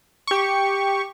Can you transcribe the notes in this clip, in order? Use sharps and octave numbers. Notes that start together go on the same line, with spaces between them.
G4 C#6